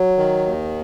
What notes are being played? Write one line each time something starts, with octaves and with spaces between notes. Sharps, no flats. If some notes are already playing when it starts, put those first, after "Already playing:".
Already playing: F#3
D#3
D#2